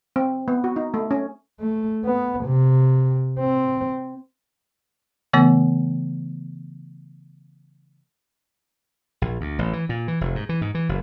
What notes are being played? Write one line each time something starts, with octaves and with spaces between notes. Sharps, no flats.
C4
B3
F#4
D#4
A3
C#4
A3
B3
C3
C4
C#3 E3 A3 B3
A#1
D2
A1
E3
A#2
E3
F1
G#2
E3
G#2
E3
F#1